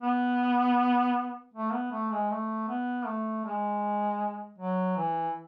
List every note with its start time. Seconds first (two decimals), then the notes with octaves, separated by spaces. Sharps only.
0.02 B3
1.54 A3
1.73 B3
1.92 A3
2.11 G#3
2.30 A3
2.68 B3
3.06 A3
3.45 G#3
4.59 F#3
4.97 E3